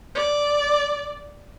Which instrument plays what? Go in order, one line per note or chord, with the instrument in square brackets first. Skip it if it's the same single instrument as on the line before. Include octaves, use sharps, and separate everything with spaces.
[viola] D5